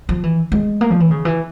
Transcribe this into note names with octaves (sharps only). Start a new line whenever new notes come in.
F3
E3
G#3
A#3
F3
E3
C#3
E3